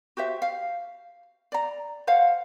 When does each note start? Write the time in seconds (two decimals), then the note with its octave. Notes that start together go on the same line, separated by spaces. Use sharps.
0.17 F#4 G4 C5 E5
0.42 F5
1.52 D5 A#5
2.07 C5 C#5 F5 F#5